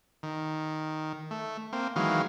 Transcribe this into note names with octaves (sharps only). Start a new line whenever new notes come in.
D#3
A3
A#3 C4
D#3 E3 F#3 G#3 F5